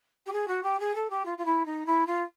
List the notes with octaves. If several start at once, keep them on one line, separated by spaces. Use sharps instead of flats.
G4
G#4
F#4
G4
G#4
A4
G4
F4
F4
E4
D#4
E4
F4